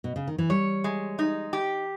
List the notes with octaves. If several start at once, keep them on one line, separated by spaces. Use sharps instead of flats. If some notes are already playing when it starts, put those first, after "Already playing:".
B2
C#3
D#3
E3
G3 C#5
G#3
D#4
G4